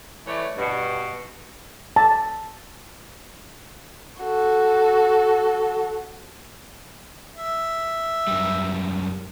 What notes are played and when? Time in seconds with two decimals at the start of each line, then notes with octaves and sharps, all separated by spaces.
0.26 E3 A3 C#5 D5
0.57 G2 B2
1.96 A5
4.20 F#4 A4
7.35 E5
8.27 F#2 G3